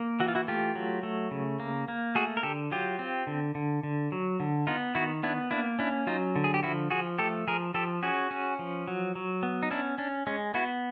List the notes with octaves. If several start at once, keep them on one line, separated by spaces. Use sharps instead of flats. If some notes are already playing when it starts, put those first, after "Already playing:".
Already playing: A#3
E3 F#4
F4
E4 F#4
A3 F4 G4
F#3
A3
C#3
A#3
A#3
A3 F#4 G#4
A#4
D3 G4 A4
F#3 F4 G4
C4
D3
D3
D3
F#3
D3
B3 D#4 F4
D#3 E4 F#4
B3 D4 E4
A#3 D4 E4
C#4 D4 E4
F#3 D#4 F4
D3
G#4
G4
F3 E4 F#4
F3 F#4 G#4
A3 G4 A4
F3 G#4 A#4
F3 G4 A4
C#4 F#4 G#4
C#4
F3
F#3
F#3
B3
D#4
C#4 D4 E4
C#4 D4
G#3 C#4
B3 E4 F#4